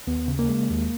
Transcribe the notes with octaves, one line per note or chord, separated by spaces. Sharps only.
D#2 B3
C#3
A#3
G#3
D#2